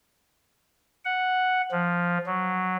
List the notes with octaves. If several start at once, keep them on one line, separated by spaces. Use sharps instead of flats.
F#5
F3
F#3